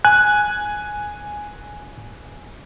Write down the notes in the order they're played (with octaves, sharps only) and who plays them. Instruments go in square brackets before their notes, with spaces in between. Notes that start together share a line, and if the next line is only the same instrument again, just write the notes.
[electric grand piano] G#5 [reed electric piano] F#6